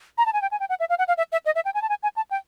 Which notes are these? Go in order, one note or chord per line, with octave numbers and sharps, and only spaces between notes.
A#5
A5
G#5
G5
G#5
G5
F#5
E5
F5
F#5
F5
E5
E5
D#5
E5
G5
G#5
A5
G#5
G#5
A5
G5